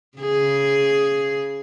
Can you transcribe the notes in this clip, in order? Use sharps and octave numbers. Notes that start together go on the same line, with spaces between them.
C#3 G#4